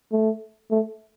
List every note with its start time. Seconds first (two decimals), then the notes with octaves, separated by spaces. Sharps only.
0.12 A3
0.71 A3